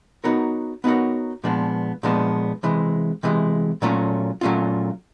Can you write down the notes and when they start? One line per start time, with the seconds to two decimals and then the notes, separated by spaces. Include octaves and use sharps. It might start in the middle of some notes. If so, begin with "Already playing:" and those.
0.24 B3 D#4 F#4 A#4 C#5
0.84 B3 D#4 F#4 A#4 C#5
1.44 A#2 F3 G#3 B3 D4
2.03 A#2 F3 G#3 B3 D4
2.63 C3 E3 G#3
3.23 C3 E3 G#3
3.82 A#2 F#3 A3 C#4 F4
4.41 A#2 F#3 A3 C#4 F4